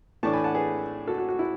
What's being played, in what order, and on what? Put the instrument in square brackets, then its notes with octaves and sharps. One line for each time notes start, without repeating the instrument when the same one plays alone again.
[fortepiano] A2 E3 A3 D4 A5 C#6
G#5 B5
F#5 A5
G#4 B4
F#4 A4
F#4
F#4
E4